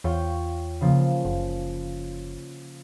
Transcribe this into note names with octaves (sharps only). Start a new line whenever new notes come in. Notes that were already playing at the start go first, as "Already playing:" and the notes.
E2 F4 C#5 G5
C#3 F3 A#3
F#1